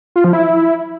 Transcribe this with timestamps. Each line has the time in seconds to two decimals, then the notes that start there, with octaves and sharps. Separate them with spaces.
0.16 F4
0.24 F3
0.33 E4